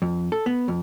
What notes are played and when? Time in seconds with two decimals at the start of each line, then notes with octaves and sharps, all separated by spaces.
0.02 F2
0.32 A4
0.46 B3
0.68 F2